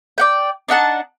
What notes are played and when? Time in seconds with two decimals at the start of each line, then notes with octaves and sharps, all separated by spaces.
0.18 D5 F#5 G5
0.68 D4 D#4 F#5 A5